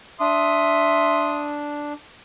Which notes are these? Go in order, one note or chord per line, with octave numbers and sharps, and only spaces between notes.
D4 E5 C6 D#6